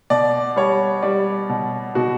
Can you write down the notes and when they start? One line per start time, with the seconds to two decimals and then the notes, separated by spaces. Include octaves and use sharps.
0.10 B2 D5
0.56 G3 C#5
1.02 G3 D5
1.49 B2
1.95 B2 F#4